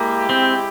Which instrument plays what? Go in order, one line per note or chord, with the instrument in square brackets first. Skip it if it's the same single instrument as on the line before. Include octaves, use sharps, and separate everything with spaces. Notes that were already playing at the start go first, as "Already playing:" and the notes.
Already playing: [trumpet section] G#3 E4 G4 [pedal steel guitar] A#3
[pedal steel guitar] C4